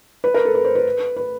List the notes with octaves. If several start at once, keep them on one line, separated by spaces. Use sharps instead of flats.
B4
A#4
A4
B4
C5
B4
B4